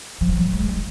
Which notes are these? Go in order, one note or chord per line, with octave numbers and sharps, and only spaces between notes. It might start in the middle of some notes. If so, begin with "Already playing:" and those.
F3
F#3
G#3
F3